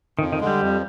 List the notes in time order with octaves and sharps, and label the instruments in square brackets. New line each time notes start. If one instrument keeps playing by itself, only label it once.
[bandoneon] F2 [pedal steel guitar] D#3
[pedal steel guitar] D#3
[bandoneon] D3 G#3
[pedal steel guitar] G3
[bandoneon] F2